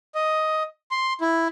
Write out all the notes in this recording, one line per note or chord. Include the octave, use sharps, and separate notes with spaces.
D#5
C6
E4